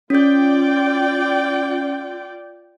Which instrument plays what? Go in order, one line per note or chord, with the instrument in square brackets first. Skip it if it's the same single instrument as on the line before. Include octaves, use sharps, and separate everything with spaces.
[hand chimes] C#4 G6 [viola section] F4 D5 G5